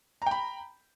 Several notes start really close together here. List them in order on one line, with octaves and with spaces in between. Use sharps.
A#5 G5 B5